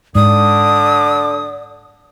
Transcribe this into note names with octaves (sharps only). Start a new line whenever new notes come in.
G#2 D3 D5 D#6